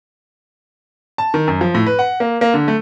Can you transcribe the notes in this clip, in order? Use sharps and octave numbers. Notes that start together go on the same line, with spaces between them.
A5
D#3
F#2
F3
A2
B4
F#5
A#3
A#3
D3
A3